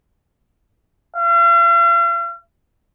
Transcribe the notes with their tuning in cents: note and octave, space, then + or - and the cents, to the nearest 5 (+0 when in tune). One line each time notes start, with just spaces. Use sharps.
F5 -45